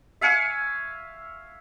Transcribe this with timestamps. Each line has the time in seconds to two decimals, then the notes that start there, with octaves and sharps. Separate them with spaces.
0.21 E5 F5 G#5 C#6